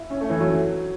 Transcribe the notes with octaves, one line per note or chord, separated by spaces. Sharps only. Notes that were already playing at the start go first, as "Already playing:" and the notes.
Already playing: E4
C#4
A3
E3
F#3